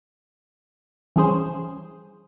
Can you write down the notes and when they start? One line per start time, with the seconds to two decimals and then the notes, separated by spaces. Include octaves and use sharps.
1.16 E3 G3 C#4 G#4 C5